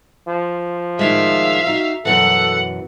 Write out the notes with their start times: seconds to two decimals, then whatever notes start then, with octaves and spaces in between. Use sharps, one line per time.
0.28 F3
0.99 A2 D#3 G#3 E5 F5
1.67 D#4 F#4
2.05 F#2 B2 E3 A4 F#5